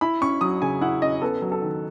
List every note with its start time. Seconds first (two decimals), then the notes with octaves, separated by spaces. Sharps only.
0.01 E4 B5
0.21 C#4 C#6
0.41 F#3 D#6
0.62 C#3 G#5
0.81 E4 F#5
1.02 C#4 D#5
1.22 B3 A4
1.42 F#3
1.52 A4
1.62 D#3